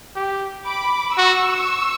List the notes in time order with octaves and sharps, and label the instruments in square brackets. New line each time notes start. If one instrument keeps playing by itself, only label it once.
[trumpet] G4
[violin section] B5 D6
[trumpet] F#4 [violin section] C#6 E6